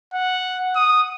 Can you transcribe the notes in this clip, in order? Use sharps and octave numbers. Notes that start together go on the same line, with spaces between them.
F#5
D#6